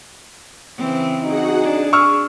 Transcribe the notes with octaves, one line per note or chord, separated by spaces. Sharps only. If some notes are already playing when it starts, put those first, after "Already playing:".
C#3 E3 C4
D#4 F#4 G#4 F#5
D4 G#4
C#6 E6 F6